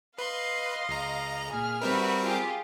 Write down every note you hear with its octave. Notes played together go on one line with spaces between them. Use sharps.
B4 D#5 F5 C6
C#2 A#5
A#2 G#4 F6
G3 C4 F#4 A#4 B4 E5
F4 G4 G#4